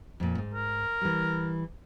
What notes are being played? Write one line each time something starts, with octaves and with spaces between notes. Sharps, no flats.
F2 A#2
G#2
A#4
E3 G3